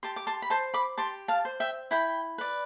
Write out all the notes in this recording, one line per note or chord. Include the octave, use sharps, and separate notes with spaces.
G4 A5 C6
D6
A5 C6
B5
C5 A5 C6
B5 D6
G4 A5 C6
F5 A5
C5
E5 G5
E4 G5 B5
B4 D5